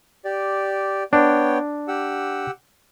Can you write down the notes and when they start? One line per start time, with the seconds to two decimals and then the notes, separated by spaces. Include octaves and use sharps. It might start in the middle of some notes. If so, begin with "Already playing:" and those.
0.25 G4 D5
1.13 B3 D4 C#5 G5
1.88 G4 F#5 E6